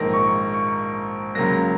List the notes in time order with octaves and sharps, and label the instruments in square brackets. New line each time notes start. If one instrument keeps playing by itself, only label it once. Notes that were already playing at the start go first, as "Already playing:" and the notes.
Already playing: [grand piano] A#1 G#2 D#3 A#3 A#6
C#6
C#6
C#2 C#3 F#3 A#3 A#6